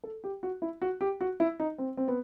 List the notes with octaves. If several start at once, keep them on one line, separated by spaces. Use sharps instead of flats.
A4
G4
F#4
E4
F#4
G4
F#4
E4
D#4
C4
C4
B3